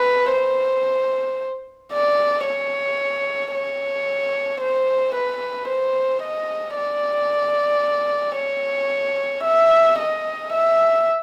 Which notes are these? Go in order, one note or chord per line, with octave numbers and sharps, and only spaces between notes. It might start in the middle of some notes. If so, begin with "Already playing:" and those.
Already playing: B4
C5
D5
C#5
C#5
C5
B4
C5
D#5
D5
C#5
E5
D#5
E5